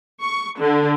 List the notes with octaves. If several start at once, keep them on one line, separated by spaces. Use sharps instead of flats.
C#6
D3